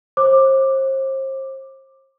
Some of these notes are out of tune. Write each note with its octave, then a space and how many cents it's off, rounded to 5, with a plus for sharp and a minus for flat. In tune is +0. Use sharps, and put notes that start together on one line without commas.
C5 +35 D6 +10